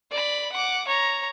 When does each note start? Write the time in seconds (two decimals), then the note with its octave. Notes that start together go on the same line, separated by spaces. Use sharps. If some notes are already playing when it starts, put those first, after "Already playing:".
0.11 D5 B5
0.52 F#5 D6
0.87 C#5 A#5